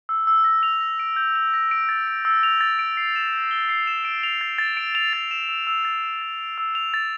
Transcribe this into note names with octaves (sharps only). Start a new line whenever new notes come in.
E6
E6
A#6
F7
A#6
D7
G6
F7
A#6
D7
A6
D7
E6
F7
A6
D7
C7
E7
G6
G7
C7
E7
D7
F7
A6
A6
D7
F7
A6
E7
E6
E6
A6
E7
A6
D7
E6
F7
A6